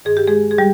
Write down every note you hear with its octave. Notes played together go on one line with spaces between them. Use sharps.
G2 D#3 G#4
G4
G#3 G#4
G#4
G3 G4